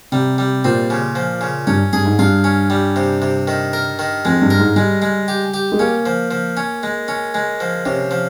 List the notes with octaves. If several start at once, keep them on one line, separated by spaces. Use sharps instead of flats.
C3 G3
G3
A#2 C4
C#3
F3
C#3
G2 C#4
G2 G#4
G#2
G2 F4
C#4
G3
C3
C3
D#3
A#4
D#3
F2 G#3
G2
A#4
G#2
G3 G#3
G#3
G4
G4
G#3
A#3 C#4
F3
F3
C#4
G#3
C#4
G#3
F3
C3 C#4
F3